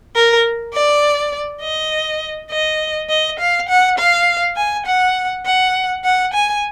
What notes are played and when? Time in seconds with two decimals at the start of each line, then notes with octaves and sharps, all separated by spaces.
0.15 A#4
0.74 D5
1.62 D#5
2.51 D#5
3.09 D#5
3.40 F5
3.69 F#5
3.98 F5
4.56 G#5
4.86 F#5
5.46 F#5
6.05 F#5
6.34 G#5